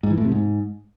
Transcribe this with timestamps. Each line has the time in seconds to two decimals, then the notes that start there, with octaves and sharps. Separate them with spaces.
0.03 G#2
0.10 E3
0.17 A2
0.25 C3
0.32 G#2